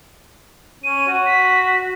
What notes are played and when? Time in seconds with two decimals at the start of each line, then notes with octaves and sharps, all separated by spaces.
0.84 C#4 D#7
1.07 F#4
1.26 B6